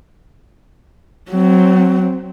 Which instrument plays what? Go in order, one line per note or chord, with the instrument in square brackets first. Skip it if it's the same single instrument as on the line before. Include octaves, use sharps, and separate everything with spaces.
[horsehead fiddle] F#3 C4